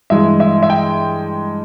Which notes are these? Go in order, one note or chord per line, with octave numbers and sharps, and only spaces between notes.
G2 E3 G#3 E5
E5
E5
G5